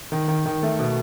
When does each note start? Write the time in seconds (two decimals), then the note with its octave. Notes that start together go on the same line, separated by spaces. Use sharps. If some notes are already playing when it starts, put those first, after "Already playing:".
0.12 D#3
0.28 D#3
0.46 D#3
0.63 A3
0.79 B2